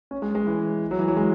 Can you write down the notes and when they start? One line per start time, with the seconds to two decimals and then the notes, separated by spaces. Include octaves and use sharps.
0.11 C#4
0.22 G#3
0.35 G#3
0.46 E3
0.91 F#3
0.99 E3
1.08 F#3
1.17 G#3